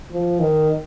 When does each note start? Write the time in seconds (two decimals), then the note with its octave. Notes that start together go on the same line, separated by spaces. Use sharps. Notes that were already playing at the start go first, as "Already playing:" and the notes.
0.11 F3
0.40 D#3